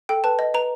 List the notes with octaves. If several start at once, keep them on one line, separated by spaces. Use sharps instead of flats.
A4 G5
B4 A5
D#5
B4 A#5